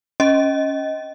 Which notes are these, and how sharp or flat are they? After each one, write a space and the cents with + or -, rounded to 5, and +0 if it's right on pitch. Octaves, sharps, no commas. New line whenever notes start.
C#4 +0 D#5 +15